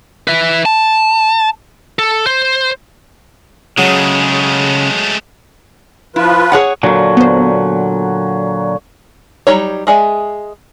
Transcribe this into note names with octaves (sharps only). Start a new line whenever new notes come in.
B4 E5
A5
A4
C5
C#3 F#3 G#3 A3
F3 E4 F4 B4
G#4 C#5 F#5
A#2 D3 F#3
B3 C5
F#3 G3 D#4 C#5
G#3 G#4 D5 E5